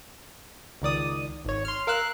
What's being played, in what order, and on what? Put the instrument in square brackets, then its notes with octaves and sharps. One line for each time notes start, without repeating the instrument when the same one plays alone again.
[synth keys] C#2 D#3 D5 D#6
G#1 C#5
C6 F6
A#4 F5 E6 F#6